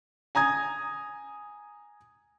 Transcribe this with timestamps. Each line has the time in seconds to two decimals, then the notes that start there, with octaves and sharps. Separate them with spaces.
0.35 G#5 A#5 D#6 G#6